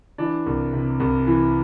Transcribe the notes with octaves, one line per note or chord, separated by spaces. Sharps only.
E3 D4
C2
C3
C2
E3